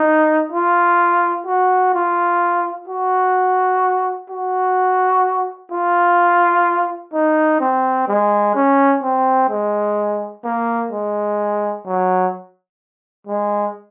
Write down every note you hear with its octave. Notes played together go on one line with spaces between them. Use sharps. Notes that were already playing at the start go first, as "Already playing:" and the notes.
Already playing: D#4
F4
F#4
F4
F#4
F#4
F4
D#4
C4
G#3
C#4
C4
G#3
A#3
G#3
F#3
G#3